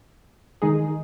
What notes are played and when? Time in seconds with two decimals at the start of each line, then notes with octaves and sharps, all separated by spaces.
0.62 D#3 G#3 D#4 G#4